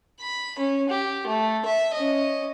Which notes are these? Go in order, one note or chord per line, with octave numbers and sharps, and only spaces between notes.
B5
C#4
G4
A3
E5
C#4 D#5